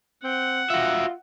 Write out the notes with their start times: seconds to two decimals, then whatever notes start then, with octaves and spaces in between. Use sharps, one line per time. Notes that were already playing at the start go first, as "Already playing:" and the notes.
0.24 C4 F#5
0.70 F4 F#4 E5